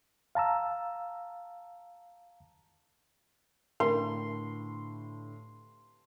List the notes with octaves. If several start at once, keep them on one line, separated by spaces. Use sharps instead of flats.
F5 A5 A#5 E6
A2 D3 A#4 C6